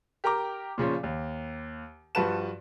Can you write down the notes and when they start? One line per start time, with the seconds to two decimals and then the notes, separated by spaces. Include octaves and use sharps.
0.24 G4 A#4 G5 A#5 D6
0.78 A#2 C#3 F3 C#4
1.03 D#2
2.15 G2 F3 F#4 B4 A5 E7